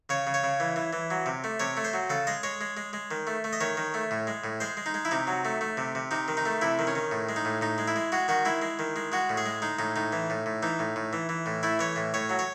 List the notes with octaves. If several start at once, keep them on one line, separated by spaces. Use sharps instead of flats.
C#3 C#5
C#3
C#5
C#3
E3
E3
E3
F#3
C3
A3
C3 C#5
A3
C5
F#3
C#3 A4
G#3 D#5
G#3 C#5
G#3
G#3
G#3
D#3
A3
A3
D#5
D#3 C#5
D#3
A3
A2
G#3
A2
G#3 C5
G#3
D#4
G#3
E4
C3 D#4
F#3
A3
A3
C3
C3
C3 D#4
D#3
D#4
A3
C3 E4
D#3
C#4
D#3
A2
G#3
D#4
A2
A2 D#4
G#3
E4
G#3
G#3 F#4
D#3 F#4
G#3 E4
G#3
D#3
G#3
G#3 F#4
A2
G#4
G#3
G#3 D#4
A2 D#4
A2 D#4
E3
A2
A2
E3 D#4
A2
A2
E3
E3
A2
A3 E4
E3 C#5
A2
A2 C#5
F#3
C#5